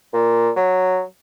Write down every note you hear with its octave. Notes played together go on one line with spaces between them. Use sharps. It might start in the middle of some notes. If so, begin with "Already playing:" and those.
A#2
F#3